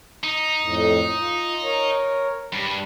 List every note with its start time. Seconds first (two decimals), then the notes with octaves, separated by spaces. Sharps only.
0.23 D#4
0.61 F2 A2
1.18 F4
1.63 A#4 C#5
2.53 G2 G3